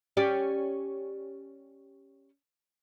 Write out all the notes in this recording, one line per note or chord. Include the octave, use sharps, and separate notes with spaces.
C#4 G4 D5